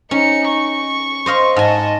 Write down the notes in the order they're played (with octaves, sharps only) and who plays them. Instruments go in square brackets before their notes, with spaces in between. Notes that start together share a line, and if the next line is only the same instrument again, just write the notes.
[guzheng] C#4 [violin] D#4 C#7
[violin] C#6
[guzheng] C5 D#5 F5
[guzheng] G#2 G#5 [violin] D#5 A5